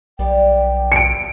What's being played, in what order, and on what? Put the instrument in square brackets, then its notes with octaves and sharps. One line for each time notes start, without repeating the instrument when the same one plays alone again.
[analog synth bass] B1 [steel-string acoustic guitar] G3 B3 D5 [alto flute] G5
[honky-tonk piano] C#7 D7